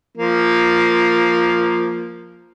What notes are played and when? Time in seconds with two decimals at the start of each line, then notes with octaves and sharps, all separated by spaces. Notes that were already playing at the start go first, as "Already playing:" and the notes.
0.17 F3 A#3